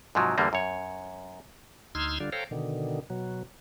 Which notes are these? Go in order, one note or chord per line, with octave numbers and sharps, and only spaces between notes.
G#2 C3 F3 F#3
E2 D3 G3 A#3
F#2 C#5
D2 D#4 C6 E6 F6 G#6
D3 G3 D4 F4
A4 C5 C#5 F5 G5 A#5
B2 D3 D#3
B2 F#3